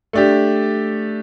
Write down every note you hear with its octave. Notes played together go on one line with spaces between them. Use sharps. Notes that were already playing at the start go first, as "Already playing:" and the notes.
A3 D4 G4